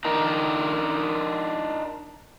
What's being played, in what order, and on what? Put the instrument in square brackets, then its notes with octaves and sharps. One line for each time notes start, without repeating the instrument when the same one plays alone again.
[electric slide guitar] D4 D#4 A#4